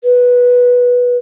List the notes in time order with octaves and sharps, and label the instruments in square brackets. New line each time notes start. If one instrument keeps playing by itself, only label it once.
[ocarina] B4